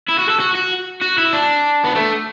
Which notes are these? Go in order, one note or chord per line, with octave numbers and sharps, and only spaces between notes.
E4
F#4
A4
F#4
F#4
F#4
E4
D4
B3
A3